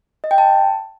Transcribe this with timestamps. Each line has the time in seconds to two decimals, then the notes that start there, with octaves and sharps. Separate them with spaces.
0.24 D#5
0.31 G5
0.38 A5